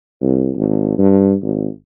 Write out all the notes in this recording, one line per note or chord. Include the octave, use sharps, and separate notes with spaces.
C2
G#1
G2
G#1